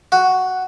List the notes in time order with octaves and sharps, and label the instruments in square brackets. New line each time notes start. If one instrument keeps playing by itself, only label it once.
[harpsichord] F#4